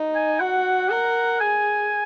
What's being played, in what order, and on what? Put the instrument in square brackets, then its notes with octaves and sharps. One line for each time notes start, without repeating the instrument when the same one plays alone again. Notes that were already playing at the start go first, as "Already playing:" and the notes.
Already playing: [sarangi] D#4
[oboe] G#5
[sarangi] F#4 [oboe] F#5
[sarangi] A#4 [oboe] F#5
[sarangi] G#4 [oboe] G#5